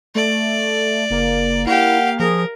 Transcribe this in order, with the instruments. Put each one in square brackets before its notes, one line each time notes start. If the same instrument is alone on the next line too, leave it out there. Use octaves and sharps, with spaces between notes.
[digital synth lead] A3 [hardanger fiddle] D5
[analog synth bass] F#1 [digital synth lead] A#3
[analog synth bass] E4 [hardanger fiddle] G4 F5 [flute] F#5
[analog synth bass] F3 [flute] G#4 [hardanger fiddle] A#4